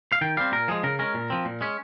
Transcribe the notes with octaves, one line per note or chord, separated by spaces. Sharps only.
F5
D#3 G5
G3 C4 F5
A#2 A#4
F3 G#3 G#4
C#3 A#4
G#3 C#4 A#4
A#2
F3 C4
A#2
G#3 C#4